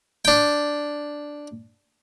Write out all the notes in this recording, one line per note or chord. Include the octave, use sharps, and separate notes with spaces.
D4 G5